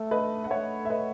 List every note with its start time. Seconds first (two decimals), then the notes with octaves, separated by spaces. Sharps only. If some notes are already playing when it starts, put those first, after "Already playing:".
Already playing: A3 A4
0.11 B4 D#5
0.44 F#5
0.50 A3 C#5 E5
0.85 E5
0.90 B4 D#5